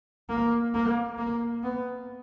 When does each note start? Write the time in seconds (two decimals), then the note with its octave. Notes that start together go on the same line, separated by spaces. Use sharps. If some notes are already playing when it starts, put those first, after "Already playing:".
0.29 A#3
0.74 A#3
1.18 A#3
1.63 B3